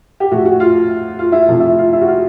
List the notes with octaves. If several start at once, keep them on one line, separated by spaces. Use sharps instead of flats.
G4
A2 F3 A3 F#4
F#4
F4
F4
E4
C3 F3 A3
E4
F4
E4
F#4
F4